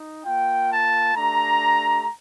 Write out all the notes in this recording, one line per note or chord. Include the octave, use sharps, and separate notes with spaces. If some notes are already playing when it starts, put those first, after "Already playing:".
Already playing: D#4
A#3 F4 G5
A5
A3 D4 G4 A#5